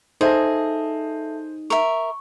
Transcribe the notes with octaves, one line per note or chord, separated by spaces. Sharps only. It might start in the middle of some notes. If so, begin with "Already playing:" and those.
D#4 G#4 A4 C5 E5 A5
A#4 E5 C#6